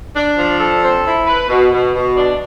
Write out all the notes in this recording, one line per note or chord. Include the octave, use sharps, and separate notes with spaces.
D4
F3
A4
C4
E4
B4
B2
B2
B2
D4